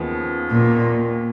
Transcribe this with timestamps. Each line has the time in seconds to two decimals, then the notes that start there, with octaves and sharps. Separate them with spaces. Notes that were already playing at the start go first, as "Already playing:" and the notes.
Already playing: D#2 C#3 F3 B3
0.51 A#2